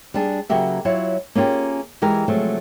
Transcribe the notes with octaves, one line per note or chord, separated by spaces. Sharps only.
G3 D4 G#4
C#3 F#3 A#3 F#4 G4 E5
F#3 E4 F4 C#5 E5
A#3 C#4 F4 G4 G#4
E3 G#3 G4 A#4
C3 F3 F#3 G#3 A3